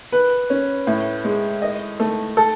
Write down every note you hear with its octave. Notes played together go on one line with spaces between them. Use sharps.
B4
C#4
A2
G#3
D#5
A3
A4